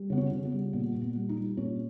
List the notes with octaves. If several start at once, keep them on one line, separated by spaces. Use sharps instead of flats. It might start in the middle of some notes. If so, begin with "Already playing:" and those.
Already playing: G3
C#3 B3
C#4
C#3
B3
G3
A#2 B3
A#2
B3
G3
D#4
G3
A#2 C#4